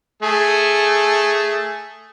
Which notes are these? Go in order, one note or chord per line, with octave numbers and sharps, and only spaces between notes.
A3 G#4